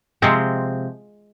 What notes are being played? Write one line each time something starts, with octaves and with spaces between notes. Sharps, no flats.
C3 F3 G#3 C4